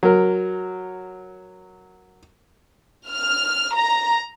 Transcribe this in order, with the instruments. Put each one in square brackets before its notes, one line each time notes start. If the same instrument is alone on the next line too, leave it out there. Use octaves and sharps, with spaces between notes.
[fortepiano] F#3 A#4
[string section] F6
A#5